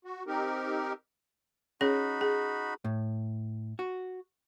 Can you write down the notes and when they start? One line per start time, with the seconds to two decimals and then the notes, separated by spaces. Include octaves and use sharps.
0.05 F#4
0.27 C4 D#4 G4 A#4
1.81 C#4 D#4 F#4 G#4 C#5 B5
2.21 G#4
2.84 A2
3.79 F#4